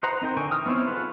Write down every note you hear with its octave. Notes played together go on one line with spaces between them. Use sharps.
D#4 B4 C5 F#5 A#5
C4 D#4 A#4 G5
D3 G5 G#5 C#6
E3 D#6 F6
B3 C4 D#4 E4 C#5
F4 G#4 A4 B4 F#5